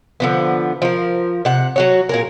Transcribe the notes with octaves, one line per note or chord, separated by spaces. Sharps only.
D3 F3 B3
F3 A#4
C3 F#5
F#3 F#4 C#5
A#2 G#4 A#4